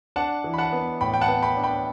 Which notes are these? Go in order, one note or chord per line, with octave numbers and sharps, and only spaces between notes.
D4 F#5 A5
E3
B5
F#5 A5
B3
A2 G5 B5
G5
F#5 A5
B3
G5 B5
D4
G5 B5